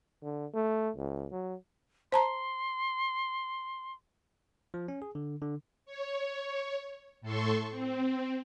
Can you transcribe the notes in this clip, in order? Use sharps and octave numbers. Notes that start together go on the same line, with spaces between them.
D3
A3
C#2
F#3
C5 A5 A#5 C6
F3
C#4
G#4
D3
D3
C#5
A2 A4 C6 C#6
C4